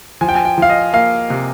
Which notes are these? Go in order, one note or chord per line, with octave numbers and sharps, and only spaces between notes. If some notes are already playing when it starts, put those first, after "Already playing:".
F3 G#5
G5
G#5
G5
F3 F5
D#5
A#3 F5
C3